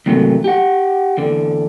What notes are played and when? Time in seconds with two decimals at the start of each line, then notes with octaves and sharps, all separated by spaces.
0.06 E2 G#2 C3 D#3 F#3 A3
0.44 G4 F#5
1.17 E2 D3